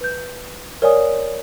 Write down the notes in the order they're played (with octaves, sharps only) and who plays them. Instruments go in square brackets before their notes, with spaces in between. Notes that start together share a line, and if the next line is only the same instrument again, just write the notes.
[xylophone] B4 G6
A#4 C#5 D5 F5 G#5 D#6